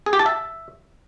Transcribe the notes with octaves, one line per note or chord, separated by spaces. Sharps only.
G#4
G4
A5
E5